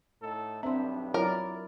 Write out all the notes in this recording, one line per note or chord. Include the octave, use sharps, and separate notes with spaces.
A2 D#4 A4
B1 G2 B3 C4 D4 C5 E5 C6
F#3 E4 F4 A#4 C#5 D5